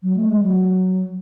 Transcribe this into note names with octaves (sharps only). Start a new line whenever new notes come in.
F#3
A3
G#3
F#3